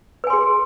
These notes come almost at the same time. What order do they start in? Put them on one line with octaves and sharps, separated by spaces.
B4 G#5 C6 G#4